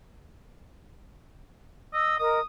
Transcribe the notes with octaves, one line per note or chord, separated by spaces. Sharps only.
D#5 E6
A#4 D#5 D#6